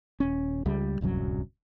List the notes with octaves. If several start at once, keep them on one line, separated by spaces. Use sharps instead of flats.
D#1 C#4
C#2 G3
D1 C2 F#2 F#3